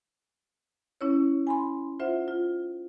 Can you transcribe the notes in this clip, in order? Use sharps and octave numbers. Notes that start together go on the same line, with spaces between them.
C#4 E4 C#5
G#5 B5 C6
F4 C5 E5 F#5
F4